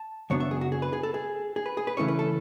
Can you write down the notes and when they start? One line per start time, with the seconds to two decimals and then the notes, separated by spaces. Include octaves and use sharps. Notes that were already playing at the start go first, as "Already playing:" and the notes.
Already playing: A5
0.30 F#2 C#3 F#3 B3 D4 C#5
0.40 E5
0.51 G#4
0.61 F#4
0.72 G#4
0.82 B4
0.93 G#4
1.03 A4
1.14 G#4
1.56 G#4
1.66 B4
1.77 G#4
1.87 B4
1.97 C#3 E3 A3 C#4 E4 C#5
2.08 B4
2.19 A4